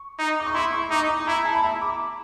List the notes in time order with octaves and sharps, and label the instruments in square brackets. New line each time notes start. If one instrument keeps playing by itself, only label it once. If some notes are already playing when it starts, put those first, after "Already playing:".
Already playing: [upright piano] C#6
[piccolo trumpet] D#4
[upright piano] D6
C#6
[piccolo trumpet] E4 [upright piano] C6
[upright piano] C#6
[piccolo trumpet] D#4 [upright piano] D6
[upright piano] D6
[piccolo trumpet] E4 [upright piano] A#5
[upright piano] A5
B5
[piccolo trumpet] E4 [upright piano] A#5
[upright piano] D6